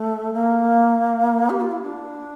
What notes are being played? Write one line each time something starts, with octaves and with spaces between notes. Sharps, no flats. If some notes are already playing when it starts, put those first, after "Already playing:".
Already playing: A3
A#3
G4
F4
E4
D4